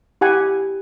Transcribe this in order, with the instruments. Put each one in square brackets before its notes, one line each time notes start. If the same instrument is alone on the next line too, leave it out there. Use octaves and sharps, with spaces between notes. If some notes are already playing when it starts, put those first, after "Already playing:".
[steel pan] E4 G4 F#5 G#5